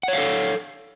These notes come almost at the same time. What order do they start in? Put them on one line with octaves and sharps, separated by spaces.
F#5 C#5 F5 A4